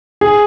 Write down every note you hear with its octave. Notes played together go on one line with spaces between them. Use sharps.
G#4